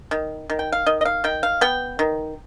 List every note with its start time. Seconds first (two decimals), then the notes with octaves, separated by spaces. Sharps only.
0.11 D#3
0.50 D#3
0.59 G5
0.72 F5
0.86 D#3 D#5
1.01 D#5
1.05 F5
1.24 D#3 G5
1.43 F5
1.61 B3 G5
1.99 D#3